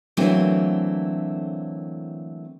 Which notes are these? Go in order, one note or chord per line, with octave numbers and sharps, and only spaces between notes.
D3 E3 F#3 A3 A#3 C4